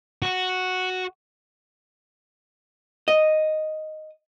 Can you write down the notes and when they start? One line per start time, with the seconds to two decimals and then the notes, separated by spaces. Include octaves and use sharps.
0.22 F#4
3.08 D#5